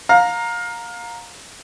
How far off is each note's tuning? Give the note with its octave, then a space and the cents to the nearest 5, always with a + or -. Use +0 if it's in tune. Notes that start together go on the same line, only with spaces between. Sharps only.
F5 +25 A#5 +0